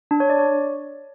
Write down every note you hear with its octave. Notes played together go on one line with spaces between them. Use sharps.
D4
C#5
D5
C#5